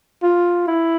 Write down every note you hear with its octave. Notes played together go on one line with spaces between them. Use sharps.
F4
E4